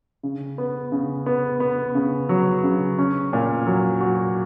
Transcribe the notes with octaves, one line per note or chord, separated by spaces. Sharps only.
C#3
B3
C#3
B3
B3
C#3
F#3
C#3
C#4
A#2
F#3
F#4